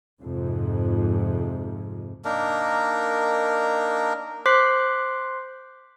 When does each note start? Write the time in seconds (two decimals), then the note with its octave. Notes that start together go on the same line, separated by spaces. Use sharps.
0.21 F2 G#2 C3
2.25 A#3 D4 D#4 A#4
4.46 C5 C6 D6 F#6 B6 C7